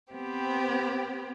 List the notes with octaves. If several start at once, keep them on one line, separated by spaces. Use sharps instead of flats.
B3 C4 G4